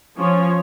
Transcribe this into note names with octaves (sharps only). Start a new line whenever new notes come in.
F3 C#4 C#5